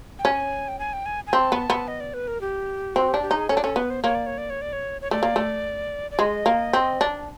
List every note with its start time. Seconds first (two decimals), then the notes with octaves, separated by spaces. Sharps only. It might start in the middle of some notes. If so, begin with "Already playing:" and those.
0.19 G5
0.25 C#4 G#5
0.68 G5
0.79 G#5
0.93 G5
1.06 G#5
1.27 G#5
1.33 C4 A5
1.52 B3
1.70 B3
1.88 D#5
2.00 D5
2.14 B4
2.27 A#4
2.41 G4
2.95 C4 F#4
3.08 G4
3.14 D4
3.22 G4
3.31 D#4
3.36 G#4
3.49 C#4 A4
3.57 D4
3.62 C#4 A4
3.76 B3 B4
3.90 C5
4.03 A#3 C#5
4.15 D5
4.26 C#5
4.38 D5
4.50 C#5
4.61 D5
4.73 C#5
5.01 C#5
5.11 A3 D5
5.23 A#3
5.36 A3
6.11 D5
6.19 G#3 D#5
6.46 A#3
6.73 C4
7.01 D4